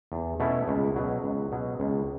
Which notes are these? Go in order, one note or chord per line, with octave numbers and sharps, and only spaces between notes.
E2
B2 A3 C#4 E4
C#2
B2 F#3
C#2
B2 F#3
C#2